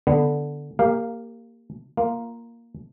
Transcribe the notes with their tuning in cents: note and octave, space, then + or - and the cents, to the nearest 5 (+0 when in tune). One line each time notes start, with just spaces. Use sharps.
D3 +0 B3 +0
A#3 -10 G4 +20 F5 +0
A#3 +0 F4 +0